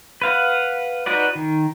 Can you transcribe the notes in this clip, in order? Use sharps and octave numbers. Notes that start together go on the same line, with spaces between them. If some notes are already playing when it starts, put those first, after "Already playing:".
B4 F5 F#5
D#4 F#4 B4 D5
D#3